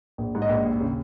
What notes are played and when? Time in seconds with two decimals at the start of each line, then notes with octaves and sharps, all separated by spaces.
0.18 A#1
0.35 G#2
0.42 D#5
0.49 A#1
0.65 D#2
0.80 C#3